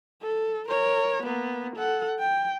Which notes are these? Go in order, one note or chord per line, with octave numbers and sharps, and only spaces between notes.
A4
A#4 C#5
A#3 B3
A4 F#5
G5